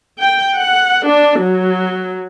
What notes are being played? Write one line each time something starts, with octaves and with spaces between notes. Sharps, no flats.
G5
F#5
D4
F#3